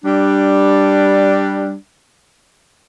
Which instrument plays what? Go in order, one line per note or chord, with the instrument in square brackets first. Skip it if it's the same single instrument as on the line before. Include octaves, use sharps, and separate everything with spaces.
[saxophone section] G3 D4